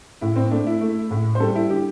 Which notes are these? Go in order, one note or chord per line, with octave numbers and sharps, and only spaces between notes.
A2 E4
C4
A3 D4
E4
A3
A2
C5
G3 A4
E4
D3 G4